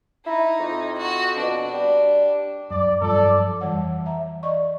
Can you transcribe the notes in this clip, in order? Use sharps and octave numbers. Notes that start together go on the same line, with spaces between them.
D#4 E4
F2
F#4
B2 D4
G3
F#2 D5
G2 F3 A4 D5
F2 E3 G3 C#5 F#5
E5 A#5
D5 D#5 C#6